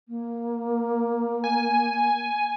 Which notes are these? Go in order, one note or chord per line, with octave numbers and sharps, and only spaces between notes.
A#3
G#5